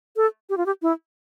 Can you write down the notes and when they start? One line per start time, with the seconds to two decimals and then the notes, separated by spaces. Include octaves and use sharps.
0.16 A4
0.50 G4
0.57 F4
0.66 G4
0.82 E4